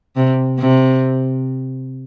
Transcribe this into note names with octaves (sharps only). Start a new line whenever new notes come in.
C3
C3